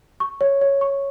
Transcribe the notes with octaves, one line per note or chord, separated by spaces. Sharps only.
C#6
C#5
C#5
C#6